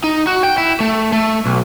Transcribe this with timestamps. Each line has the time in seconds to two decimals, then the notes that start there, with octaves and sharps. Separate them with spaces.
0.04 D#4
0.27 F#4
0.43 G5
0.58 E4
0.80 A3
1.12 A3
1.46 B1